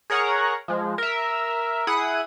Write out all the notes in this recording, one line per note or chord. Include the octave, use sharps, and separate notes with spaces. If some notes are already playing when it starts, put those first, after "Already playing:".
G#4 A#4 C#5 F#5 A#5
F3 G#3
A#4 E5
E4 G#4 F#5 D#6